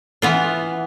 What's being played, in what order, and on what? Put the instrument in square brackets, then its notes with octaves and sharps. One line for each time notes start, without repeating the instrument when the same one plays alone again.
[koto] E3 B3 F4